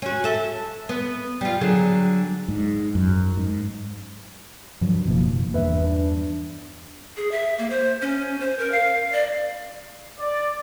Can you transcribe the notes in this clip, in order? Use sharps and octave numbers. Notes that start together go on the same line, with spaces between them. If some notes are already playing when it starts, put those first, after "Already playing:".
C#4 F#4
A4 E5
B3
G3 F4
D3 F#3 G#4
G#2
F#2
G#2
G2 F3 F#3
F#1 G#2 B2 F3 A#3
E2 G2 B4 E5
D4
G#4
E5
A#3
C5
C#4
C5
A#4
F5
D5
D5